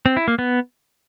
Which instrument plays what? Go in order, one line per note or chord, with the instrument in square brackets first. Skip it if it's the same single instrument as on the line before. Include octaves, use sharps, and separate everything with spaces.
[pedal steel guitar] C4
E4
A#3
B3